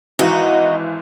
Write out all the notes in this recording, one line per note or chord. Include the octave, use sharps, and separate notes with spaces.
G#1 E3 D#4 F#4